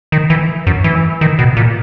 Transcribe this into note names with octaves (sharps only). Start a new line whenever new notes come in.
D#3
E3
F#2
E3
D#3
B2
A#2